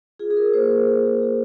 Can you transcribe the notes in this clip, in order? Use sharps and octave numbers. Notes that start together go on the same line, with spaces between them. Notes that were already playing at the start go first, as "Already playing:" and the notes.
F4 G#4
G#4
A#4
A#3 C5
A#4
F4 A#4
G#4
F4 G#4